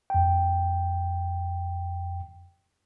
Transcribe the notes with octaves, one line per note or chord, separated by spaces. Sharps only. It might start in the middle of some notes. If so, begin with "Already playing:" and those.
F2 G5